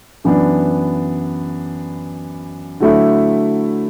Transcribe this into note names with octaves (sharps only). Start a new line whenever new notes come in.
F#2 E3 B3 D4
D3 F#3 A3 E4